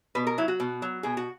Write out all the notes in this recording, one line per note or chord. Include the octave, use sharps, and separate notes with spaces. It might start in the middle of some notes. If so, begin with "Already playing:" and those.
B2 B4
A#4
F#3 E4
F#4
B2
F#3
B2 G#4
F#4